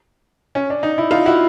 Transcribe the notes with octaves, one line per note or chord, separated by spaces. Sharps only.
C#4
D4
D#4
E4
D#4 F4
E4 F#4